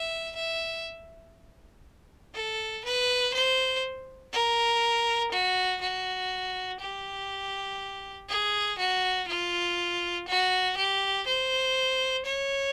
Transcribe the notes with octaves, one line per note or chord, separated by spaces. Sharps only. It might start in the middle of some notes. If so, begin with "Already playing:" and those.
Already playing: E5
E5
A4
B4
C5
A#4
F#4
F#4
G4
G#4
F#4
F4
F#4
G4
C5
C#5